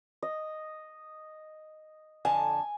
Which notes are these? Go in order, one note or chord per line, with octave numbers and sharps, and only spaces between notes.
D#5
F2 D3 G#5 A5